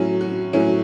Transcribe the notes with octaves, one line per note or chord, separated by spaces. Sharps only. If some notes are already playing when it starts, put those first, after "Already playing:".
Already playing: A2 F#3 C#4
F#4
A2 F#3 C#4